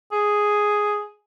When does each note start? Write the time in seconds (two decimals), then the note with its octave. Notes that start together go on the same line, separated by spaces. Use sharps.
0.12 G#4